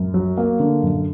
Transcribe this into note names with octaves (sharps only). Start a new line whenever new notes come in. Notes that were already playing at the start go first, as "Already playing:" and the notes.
Already playing: F#2
F#3
A#3
D3
F#2